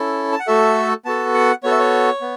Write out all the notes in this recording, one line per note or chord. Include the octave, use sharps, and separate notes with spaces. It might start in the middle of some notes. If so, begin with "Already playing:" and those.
Already playing: C#4 E4 A4
A5
F#5
A3 F#4 A4 E5
B3 F#4 A4 A5
F#5
B3 F#4 A4 C#5
E5
C#5
B3